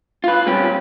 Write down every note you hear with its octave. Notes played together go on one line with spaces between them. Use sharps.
F4 B4
A#2 G3 C4 C#4 G4 B4